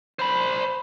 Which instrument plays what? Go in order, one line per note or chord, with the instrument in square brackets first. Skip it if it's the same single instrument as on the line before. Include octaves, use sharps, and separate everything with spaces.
[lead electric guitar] C5 B5